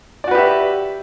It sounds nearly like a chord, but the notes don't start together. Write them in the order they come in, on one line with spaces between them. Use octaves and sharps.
D5 F#4 B4 G4 E5